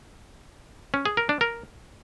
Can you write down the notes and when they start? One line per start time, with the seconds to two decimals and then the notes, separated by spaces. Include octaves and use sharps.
0.94 C#4
1.05 G#4
1.17 A#4
1.29 D4
1.41 A#4